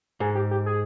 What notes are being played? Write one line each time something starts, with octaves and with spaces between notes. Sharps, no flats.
G#2 G#4
G4
G4
G#4